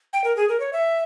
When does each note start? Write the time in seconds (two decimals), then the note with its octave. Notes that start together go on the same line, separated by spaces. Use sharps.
0.13 G5
0.24 A#4
0.36 G#4
0.49 A#4
0.60 C#5
0.73 E5